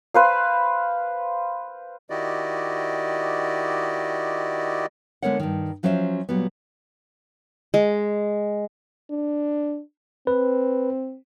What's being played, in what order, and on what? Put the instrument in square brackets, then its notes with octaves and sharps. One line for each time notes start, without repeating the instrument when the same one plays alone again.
[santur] B4 C5 F5
[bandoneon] D#3 E4 F#4 G4 D5 D#5
[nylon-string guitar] D3 G#3 B3 A#4 C#5 F#5
G2 D#3
F3 F#3 C#4 C5 C#5 E5
A#2 F#3 G3 B3
[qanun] G#3
[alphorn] D4
[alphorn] C4 [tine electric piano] B4